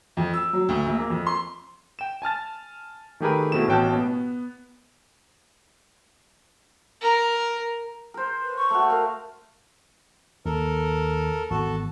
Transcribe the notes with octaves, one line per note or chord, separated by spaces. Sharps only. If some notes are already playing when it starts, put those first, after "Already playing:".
F2
E6
F#3
D2
A#1
A#3
F2
C6
G5 E7
G#5 A5 F6 A6
D#3 A3 G4 G#4 A#4 B4
B2 A3 C4 E4 E7
A1 B2 C#5 G5 A5 F#6
B3
A#4
A#4 C5
B4
C#6
A3 F#4
A#4 F5
D#2 A4 A#4
G#1 E3 B3 F#4 A4 A5